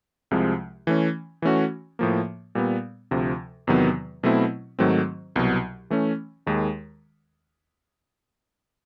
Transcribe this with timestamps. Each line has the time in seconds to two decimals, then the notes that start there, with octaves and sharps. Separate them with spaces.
0.31 C2 C3 F3 G#3
0.87 E3 A3 C#4
1.42 E3 A3 C#4 F#4
1.99 A2 F3 A#3
2.55 A#2 G3 B3
3.11 D2 C3 F3
3.67 E2 C3 D#3 F#3 B3
4.23 B2 F#3 A3 C4 E4
4.79 G#2 D#3 F#3 A3 C4
5.36 C2 B2 F#3
5.90 E3 A3 C#4
6.46 D#2 D#3 G#3